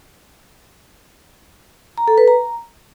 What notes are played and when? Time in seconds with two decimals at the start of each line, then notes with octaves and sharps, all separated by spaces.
1.98 A#5
2.08 A4
2.18 B4
2.28 A#5